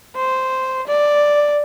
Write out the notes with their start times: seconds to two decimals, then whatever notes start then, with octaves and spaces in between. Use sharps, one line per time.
0.16 C5
0.87 D5